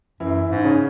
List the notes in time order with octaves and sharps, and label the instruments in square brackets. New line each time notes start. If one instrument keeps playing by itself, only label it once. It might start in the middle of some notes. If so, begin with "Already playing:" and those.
[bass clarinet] F#2 [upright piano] E3 E4
[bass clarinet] G#2
[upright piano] C#3 C#4